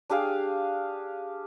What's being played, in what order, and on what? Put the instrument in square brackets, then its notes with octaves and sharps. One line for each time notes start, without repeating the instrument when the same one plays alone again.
[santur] D4 G4 G#4 F5